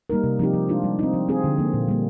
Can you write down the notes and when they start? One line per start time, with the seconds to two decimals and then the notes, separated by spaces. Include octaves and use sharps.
0.10 G3 A#3 D#4 A#4
0.24 C3
0.39 F3 C4 D#4 G4
0.54 F3
0.69 G#3 D4 F4
0.84 G3
0.99 C4 D#4
1.14 F3
1.28 C4 F4 G#4
1.44 D3
1.58 F3 A#3
1.74 A#2
1.88 G3 A#3